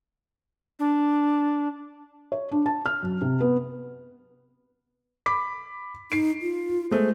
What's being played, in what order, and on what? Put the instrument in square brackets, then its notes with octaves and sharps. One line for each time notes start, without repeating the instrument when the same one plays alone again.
[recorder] D4
[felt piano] C#5
D4
A5
F6
F#2
C3
B3
B5 D6 B6
[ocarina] D#4 [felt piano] C7 D7
[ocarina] F4
[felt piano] G#3 A3 [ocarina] C5